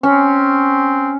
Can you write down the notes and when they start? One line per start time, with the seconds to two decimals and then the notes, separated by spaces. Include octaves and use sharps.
0.03 C4 C#4